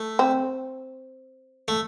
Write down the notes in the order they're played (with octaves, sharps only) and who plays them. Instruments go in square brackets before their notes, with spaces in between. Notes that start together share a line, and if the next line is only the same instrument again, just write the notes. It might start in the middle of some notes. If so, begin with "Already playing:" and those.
Already playing: [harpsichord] A3
[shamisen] C4
[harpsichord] A3